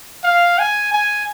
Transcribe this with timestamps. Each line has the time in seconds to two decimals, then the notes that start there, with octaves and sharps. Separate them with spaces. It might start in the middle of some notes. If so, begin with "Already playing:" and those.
0.24 F5
0.59 G#5
0.93 G#5